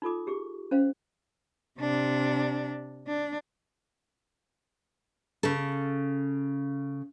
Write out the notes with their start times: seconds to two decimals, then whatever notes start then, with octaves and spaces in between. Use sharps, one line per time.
0.02 D#4 F4 A4 D6
0.27 G4 G#4 C#6
0.71 C#4 C5 F5
1.80 C3 D4
3.07 D4
5.43 C#3 A4